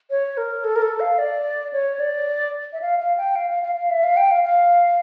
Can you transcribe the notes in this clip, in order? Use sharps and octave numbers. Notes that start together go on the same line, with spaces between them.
C#5
A#4
A4
A#4
A4
F5
D5
C#5
D5
E5
F5
F5
G5
F5
F5
F5
F5
E5
F5
G5
F5
F5